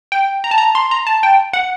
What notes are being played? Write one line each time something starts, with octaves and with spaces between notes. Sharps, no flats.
G5
A#5
A5
A#5
C6
A#5
A5
G5
F#5